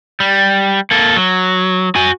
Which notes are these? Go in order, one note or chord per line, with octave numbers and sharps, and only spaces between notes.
G3
A#3 A4
F#3
F#4 G#5